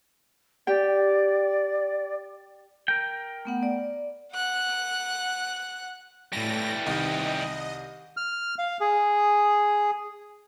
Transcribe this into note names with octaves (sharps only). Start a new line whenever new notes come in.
G4 D5 G5
A#4 G5
A3 B3 F#5
D5
F#5 F#6
A2 E3 G3 A#6
C2 D#3 D#5
F6
F5
G#4